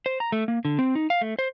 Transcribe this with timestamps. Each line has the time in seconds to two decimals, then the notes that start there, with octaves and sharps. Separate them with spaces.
0.06 C5
0.20 A#5
0.32 A3
0.48 A#3
0.65 D3
0.79 C4
0.95 D#4
1.10 F5
1.21 A3
1.39 C5